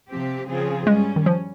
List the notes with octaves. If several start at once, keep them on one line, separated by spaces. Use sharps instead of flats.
C3 F3 C4 G4
C#3 F3 C4 F4 G#4
G2 G3 G#3 C#4
D#3
F3